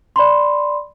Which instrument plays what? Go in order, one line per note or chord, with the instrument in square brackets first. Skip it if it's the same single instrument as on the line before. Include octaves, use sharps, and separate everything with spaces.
[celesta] D5 B5 C6